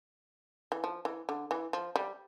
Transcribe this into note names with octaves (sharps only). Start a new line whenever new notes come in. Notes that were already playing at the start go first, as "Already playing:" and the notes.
E3
F3
E3
D3
E3
F3
G3